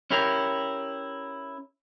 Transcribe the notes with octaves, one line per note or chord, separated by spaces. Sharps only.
C#4 E4 G4 A#4